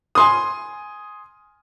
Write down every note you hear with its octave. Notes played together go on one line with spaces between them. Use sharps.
G#5 C6 D#6